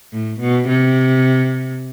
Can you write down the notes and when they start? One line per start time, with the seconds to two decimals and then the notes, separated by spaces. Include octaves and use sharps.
0.13 A2
0.40 B2
0.69 C3